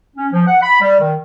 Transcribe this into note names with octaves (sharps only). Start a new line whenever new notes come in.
C#4
F3
F#5
B5
G3
D#3